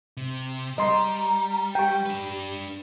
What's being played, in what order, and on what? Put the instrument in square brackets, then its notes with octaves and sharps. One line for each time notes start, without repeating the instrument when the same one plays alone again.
[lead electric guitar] C3
[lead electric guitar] G3 [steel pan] D#5 C6 [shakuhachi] A#5
[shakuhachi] G4 [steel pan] G5 C#6
[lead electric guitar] D4 B4